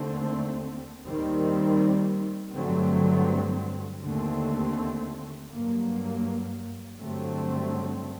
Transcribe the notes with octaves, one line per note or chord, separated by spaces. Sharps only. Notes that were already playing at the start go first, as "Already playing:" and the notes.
Already playing: D#2 D3 A3 C4
D#2 D#3 G3 C4
G2 D3 F#3 A3 C4
D#2 D3 A3 C4
G2 F#3 A#3
G2 D3 F#3 A3 C4